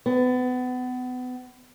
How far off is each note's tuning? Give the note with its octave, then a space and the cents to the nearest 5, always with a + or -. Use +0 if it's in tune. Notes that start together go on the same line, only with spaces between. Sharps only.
B3 +30